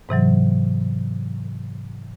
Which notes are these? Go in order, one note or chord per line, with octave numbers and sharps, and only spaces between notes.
G#2 C3 E3 F#3